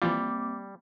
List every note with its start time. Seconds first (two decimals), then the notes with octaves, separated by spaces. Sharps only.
0.02 E3 F3 G3 A#3 C4 F4 D6